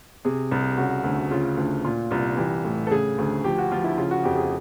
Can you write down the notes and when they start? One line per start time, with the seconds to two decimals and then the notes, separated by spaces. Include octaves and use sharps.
0.25 C3 G#4
0.51 C2
0.77 C#3 F#4
1.04 D2
1.31 C#3 F4
1.57 D2
1.84 A#2 F4
2.11 C2 F4
2.37 E3 G4
2.65 A2
2.87 A4
2.90 C#3 G#4
3.18 D2
3.44 F3 G4
3.58 F#4
3.72 F3 F4
3.84 E4
3.97 C#3 F4
4.11 F#4
4.24 F2 G4
4.37 G#4